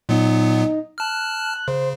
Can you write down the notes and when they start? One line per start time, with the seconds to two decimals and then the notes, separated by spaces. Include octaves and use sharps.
0.09 A#2 F#3 B3 D#4
0.98 A5 F6 F#6
1.68 C#3 C5